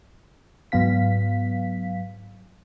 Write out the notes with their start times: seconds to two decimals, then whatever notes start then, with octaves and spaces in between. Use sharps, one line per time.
0.72 G#2 F#3 B3 F5 B6